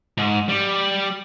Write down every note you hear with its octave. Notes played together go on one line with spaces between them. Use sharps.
G#2
G3